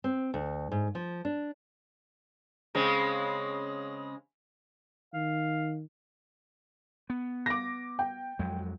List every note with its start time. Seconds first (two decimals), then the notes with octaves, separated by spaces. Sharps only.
0.04 C4
0.34 D2
0.72 G#2
0.95 F3
1.25 D4
2.75 C#3 G#3 C4
5.14 D#3 F5
7.10 B3
7.46 D6 A#6
7.99 G5
8.39 F2 F#3 G#3